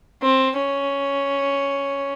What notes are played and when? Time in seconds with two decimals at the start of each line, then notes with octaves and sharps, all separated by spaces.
0.22 C4
0.57 C#4